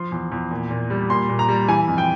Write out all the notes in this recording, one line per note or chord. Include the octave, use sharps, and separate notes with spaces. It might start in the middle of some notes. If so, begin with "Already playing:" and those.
Already playing: F3 C6
E2
E2
A#2
A#2
G3
A#2 C6
A#2
A#5
G3
E3 G#5
F2
G5